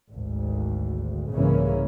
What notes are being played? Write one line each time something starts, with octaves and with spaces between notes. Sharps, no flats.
G#1 D2
C2 G#2 C#3 E3 A#3 C#4